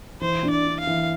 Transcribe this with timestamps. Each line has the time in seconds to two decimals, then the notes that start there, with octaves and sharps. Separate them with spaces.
0.21 E3 C5
0.43 D4
0.50 D5
0.65 D4
0.80 F5
0.87 E3